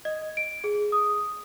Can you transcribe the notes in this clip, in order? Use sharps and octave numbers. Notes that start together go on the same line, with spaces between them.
D#5
D7
G#4
D#6